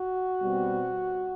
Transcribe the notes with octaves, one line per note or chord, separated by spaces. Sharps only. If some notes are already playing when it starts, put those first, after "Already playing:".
Already playing: F#4
B2 G3 C4